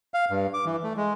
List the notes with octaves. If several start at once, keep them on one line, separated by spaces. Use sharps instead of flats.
F5
G2
D6
E3
A3
G#3